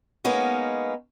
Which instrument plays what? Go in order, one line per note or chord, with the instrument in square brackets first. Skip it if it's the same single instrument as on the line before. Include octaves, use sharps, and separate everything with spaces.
[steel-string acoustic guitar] G#3 A#3 B3 C#4 D#4